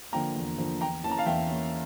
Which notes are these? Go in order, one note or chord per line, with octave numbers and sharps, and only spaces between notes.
D3 F3 A#3 G5 A#5
E2
D3 F3 A#3
E2 G5 A#5
E3 A#3 C#4 A5
A#5
F5 A5
E2 E5 G5
E3 A#3 C#4